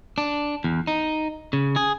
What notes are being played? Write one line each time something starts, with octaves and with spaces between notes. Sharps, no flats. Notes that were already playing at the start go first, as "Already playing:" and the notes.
D4
E2
D#4
C#3
G#4